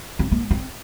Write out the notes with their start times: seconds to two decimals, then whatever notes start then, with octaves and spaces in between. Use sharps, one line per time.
0.19 C4
0.32 A#3
0.51 C4